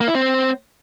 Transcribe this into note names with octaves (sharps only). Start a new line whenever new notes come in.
A#3
E4
C4